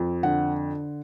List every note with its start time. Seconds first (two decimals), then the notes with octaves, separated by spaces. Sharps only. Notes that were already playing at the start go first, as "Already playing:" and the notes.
Already playing: F2
0.23 D3 F#5